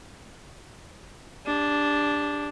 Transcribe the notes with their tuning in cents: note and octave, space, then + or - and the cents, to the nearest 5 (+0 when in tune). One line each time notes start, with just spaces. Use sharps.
D4 -5 G4 +35